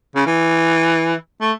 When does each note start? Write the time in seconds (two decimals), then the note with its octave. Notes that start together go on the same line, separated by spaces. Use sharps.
0.16 C#3
0.27 E3
1.41 A3